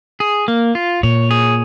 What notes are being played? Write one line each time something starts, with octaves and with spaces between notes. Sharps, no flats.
G#4
A#3
F4
A#2 C#5
G#4